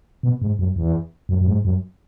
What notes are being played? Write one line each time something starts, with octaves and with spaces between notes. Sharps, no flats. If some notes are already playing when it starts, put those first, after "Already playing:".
B2
G#2
F#2
E2
F#2
F#2
G#2
F#2